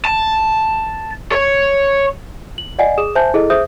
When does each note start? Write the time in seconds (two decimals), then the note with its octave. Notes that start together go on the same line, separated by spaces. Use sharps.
0.05 A5
1.32 C#5
2.58 F#7
2.79 D5 D#5 F#5 G#5
2.98 G#4 D#6 E7
3.15 C5 E5 G#5 A5 G6
3.34 E4 G#4 A4 D#5
3.50 G#4 C5 E5 D#6 G6